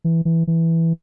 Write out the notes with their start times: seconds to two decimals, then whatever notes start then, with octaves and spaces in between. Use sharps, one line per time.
0.04 E3
0.25 E3
0.47 E3